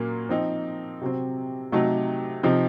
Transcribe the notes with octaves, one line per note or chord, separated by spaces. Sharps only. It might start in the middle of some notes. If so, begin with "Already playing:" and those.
Already playing: A#2 F#3 A#3 C#4
F3 C4 D#4
C3 F#3 C4
C3 F#3 A3 D#4
C3 F3 C4 D#4